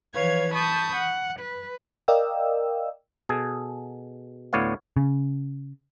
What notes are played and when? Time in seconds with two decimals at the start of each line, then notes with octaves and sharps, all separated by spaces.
0.13 E3 F3 B4 C#5 F5 G#6
0.53 A5 B5 C#6 D#6 G6
0.96 F#5
1.39 B4
2.08 A#4 D5 D#5 F5 G5 E6
3.29 B2 G#4 A4
4.53 D2 A2 B3 C#5 D5 F5
4.97 C#3